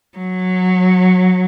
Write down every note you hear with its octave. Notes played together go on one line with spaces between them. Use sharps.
F#3